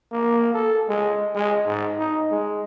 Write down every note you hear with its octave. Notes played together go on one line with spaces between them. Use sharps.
A#3
A4
G#3
G#3
G#2
D#4
G#3